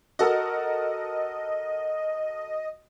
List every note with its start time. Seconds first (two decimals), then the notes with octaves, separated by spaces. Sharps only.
0.19 F#4 A4 A#4 D#5